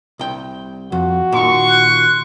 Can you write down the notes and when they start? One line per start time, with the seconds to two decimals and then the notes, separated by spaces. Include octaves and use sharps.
0.19 C2 G5
0.92 F2 F#4
1.32 A#2 D#3 C6 C#6
1.69 F#6